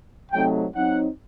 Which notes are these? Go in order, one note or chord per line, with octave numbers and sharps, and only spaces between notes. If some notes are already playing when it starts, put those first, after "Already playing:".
C3 F#3 A3 C4 D#4 G5
F#3 C4 D#4 F#5